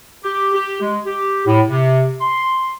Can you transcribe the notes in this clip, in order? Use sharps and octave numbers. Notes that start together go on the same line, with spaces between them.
G4
G4
G#3
G4
A2
C3
C6